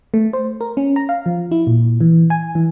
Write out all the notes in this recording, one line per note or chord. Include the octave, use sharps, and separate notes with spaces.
A3
C5
A#4
C#4
A#5
F5
F3
E4
A#2
E3
G#5
E3